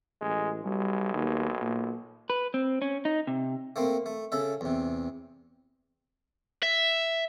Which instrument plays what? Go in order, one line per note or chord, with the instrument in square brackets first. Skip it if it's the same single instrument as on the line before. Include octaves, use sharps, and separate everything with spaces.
[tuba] A1 [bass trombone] G#3
[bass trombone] B1 [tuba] G3
[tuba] D#2
A#2
[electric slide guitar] B4
C4
C#4
D#4
C3
[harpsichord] A3 A#3 C4
A3
C#3 A4 E5
E2 C3
[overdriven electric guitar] E5